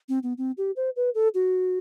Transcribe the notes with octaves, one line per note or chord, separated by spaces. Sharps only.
C4
B3
C4
G4
C5
B4
A4
F#4